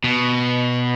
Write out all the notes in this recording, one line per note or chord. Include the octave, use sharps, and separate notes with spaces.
B2